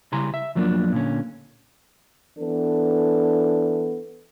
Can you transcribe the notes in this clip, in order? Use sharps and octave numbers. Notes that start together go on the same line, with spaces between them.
C#3 G3 E4 G#5 A#5 C6
E5
F2 F3 F#3 A#3 D4
A#2 D3 C#4
E3 B3 D4 A4